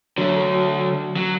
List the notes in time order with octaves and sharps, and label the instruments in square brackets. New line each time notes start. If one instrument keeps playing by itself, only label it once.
[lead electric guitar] D3 A3 [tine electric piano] F#3
[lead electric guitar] F#3